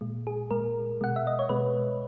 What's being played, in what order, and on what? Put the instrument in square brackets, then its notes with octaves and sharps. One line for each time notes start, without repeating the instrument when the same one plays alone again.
[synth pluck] A#2 G#3
G#4
A#2 G#3 A#4
B2 G#3 F#5
E5
D#5
C#5
B2 G#3 B4